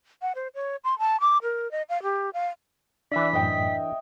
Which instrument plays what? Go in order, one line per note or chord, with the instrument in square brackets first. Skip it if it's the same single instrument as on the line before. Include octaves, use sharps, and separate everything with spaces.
[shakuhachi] F#5
C5
C#5
C6
A5
D6
A#4
D#5
F5
G4
F5
[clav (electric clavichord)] E3 D4 [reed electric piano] D5 E5 [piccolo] B6
[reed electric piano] F#2 A2 [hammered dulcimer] D#5 E5 G5